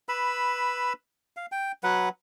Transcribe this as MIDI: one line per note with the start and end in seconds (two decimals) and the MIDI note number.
0.09 0.93 71
0.09 0.93 83
0.09 0.93 88
1.37 1.46 77
1.52 1.72 79
1.84 2.09 54
1.84 2.09 71
1.84 2.09 78